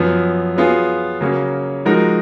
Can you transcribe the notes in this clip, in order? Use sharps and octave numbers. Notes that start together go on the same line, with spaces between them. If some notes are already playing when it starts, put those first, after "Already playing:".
Already playing: F#2 F3 B3
F#3 B3 F4 G#4
C#3 F#3 A#3 C#4
F3 G#3 D#4 F#4 A#4